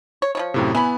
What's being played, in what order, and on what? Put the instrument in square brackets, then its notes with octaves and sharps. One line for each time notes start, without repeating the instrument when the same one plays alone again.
[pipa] C#5
F3 G3 C#5
[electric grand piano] F#2 A2 C3
[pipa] E3 B5 [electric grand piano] B3 G#5